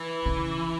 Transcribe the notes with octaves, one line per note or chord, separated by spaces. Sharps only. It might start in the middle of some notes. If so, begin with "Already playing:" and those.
Already playing: E3
C#3